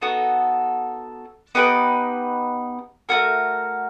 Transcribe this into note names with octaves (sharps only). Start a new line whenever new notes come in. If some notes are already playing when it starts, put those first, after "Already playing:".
B3 D#4 F#4 A4
B3 D#4 G4 B4
A3 C#4 F#4 A#4